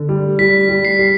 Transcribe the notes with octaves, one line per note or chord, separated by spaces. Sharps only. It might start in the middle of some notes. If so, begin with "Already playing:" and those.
Already playing: D3
G3
G3 B6
G3
C7
G3